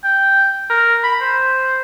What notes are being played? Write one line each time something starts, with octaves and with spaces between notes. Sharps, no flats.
G5
A#4
B5
C5